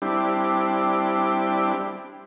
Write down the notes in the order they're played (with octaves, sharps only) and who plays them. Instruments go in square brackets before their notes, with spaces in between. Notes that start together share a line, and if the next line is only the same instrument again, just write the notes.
[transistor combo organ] G3 C4 D4 E4 G4